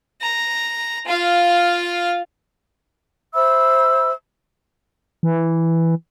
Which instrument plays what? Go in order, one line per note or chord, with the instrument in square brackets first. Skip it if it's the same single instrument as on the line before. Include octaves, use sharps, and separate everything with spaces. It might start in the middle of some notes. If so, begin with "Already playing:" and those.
[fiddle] A#5
F4 F5
[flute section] C5 E5 B5 E6
[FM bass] E3